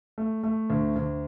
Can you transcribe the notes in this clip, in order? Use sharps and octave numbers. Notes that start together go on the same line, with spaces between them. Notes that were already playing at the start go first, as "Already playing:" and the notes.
A3
A3
D2
D2